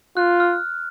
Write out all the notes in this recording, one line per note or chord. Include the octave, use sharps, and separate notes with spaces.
F4 F#6
F6